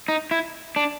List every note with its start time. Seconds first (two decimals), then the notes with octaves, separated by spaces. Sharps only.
0.08 D#4
0.31 E4
0.76 D4